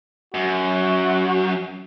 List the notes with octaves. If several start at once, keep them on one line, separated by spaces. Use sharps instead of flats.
F#2 F#4